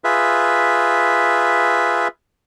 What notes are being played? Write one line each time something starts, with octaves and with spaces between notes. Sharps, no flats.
F4 G#4 B4 E5